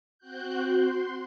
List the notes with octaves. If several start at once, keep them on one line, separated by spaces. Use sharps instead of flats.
C4 F#4 F#6 G6
C6